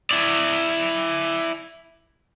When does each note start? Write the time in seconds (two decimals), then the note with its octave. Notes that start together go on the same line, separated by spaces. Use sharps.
0.11 E4 D5